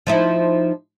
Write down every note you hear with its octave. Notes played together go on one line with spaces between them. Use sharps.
F3 D#4 E4